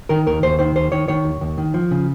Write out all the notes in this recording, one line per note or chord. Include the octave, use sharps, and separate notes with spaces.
D#3 A#4
D#2 A#4
D#2 C5
D#3 C5
D#2 C5
D#3 C#5
D#3 C#5
D#2
D#2
D#3
F3
C#3